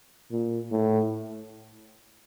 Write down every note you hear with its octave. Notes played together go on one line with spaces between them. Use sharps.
A#2
A2